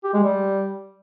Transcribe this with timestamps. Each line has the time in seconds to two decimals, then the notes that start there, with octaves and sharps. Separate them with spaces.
0.04 G4
0.13 G#3
0.23 G3